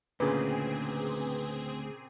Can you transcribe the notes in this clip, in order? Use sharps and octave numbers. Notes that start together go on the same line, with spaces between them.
D2 A#2 C#3 C4 G#4 B4